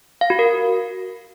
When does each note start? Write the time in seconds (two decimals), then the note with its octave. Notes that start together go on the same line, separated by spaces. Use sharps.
0.21 F5
0.30 F#4
0.39 A#4